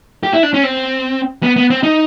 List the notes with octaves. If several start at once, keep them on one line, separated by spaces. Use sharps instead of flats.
G4
E4
D4
C#4
C4
B3
B3
C4
D#4